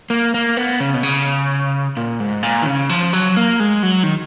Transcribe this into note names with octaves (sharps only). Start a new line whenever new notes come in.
A#3
A#3
B3
C#3
B2
C#3
A#2
G#2
A#2
D#3
C#3
F3
F#3
A#3
G#3
F#3
D#3